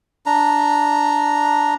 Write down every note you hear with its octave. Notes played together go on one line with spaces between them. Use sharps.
D4 A#5